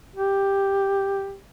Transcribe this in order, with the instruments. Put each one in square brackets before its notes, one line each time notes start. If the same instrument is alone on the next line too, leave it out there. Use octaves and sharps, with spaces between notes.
[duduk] G4